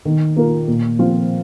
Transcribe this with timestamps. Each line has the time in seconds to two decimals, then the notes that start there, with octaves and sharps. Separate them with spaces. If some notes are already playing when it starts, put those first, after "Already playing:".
0.05 D#3
0.36 A#3 F4 A#4
0.68 A#2
0.99 F3 C4 F4